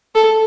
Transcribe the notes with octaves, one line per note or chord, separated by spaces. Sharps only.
A4